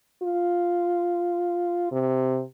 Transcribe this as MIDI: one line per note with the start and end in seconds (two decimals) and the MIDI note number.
0.23 1.88 65
1.92 2.42 48